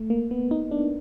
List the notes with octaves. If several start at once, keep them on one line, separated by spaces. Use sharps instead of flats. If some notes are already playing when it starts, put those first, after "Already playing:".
Already playing: A3
A#3
B3
D#4
D4